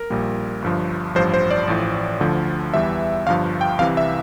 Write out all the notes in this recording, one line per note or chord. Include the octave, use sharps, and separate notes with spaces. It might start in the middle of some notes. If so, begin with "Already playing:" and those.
Already playing: A#4
A#1 A#2 G3
G1 G2 F3
A1 G2 F3 C5
C5
D5
A1 A2 F3
D2 D3 F3
E2 E3 G3 E5
G1 G2 F3 F5
G5
C2 C3 E3 F5
E5